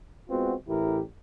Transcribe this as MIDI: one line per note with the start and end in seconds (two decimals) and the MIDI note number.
0.30 0.54 56
0.30 0.54 59
0.30 0.54 60
0.30 0.54 65
0.30 0.54 66
0.68 1.01 33
0.68 1.01 45
0.68 1.01 52
0.68 1.01 64
0.68 1.01 67
0.68 1.01 70